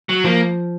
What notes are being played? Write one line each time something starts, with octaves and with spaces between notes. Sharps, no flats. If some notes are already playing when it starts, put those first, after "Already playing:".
F#3
F3 A#3